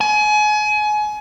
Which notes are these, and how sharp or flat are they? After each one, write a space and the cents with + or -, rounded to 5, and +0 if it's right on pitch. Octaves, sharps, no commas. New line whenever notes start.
G#5 +30